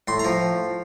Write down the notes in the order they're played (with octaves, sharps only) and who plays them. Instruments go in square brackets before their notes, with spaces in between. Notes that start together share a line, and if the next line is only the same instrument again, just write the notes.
[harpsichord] A2 C6
A#5
F3